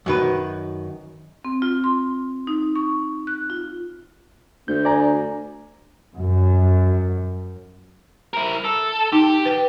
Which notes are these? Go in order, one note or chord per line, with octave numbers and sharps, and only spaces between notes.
F#2 D#3 B4
C4
F4
C6
D#4
C#6
F#6
F4
D2 G6
D5 G#5 A#5
F#2
E4 A#4
A4
D#4 G4
B4 G5